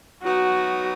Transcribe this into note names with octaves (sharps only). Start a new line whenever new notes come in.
F#3 B3 D#4 F#4